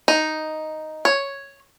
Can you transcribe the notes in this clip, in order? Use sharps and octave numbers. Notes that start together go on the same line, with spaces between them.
D#4
C#5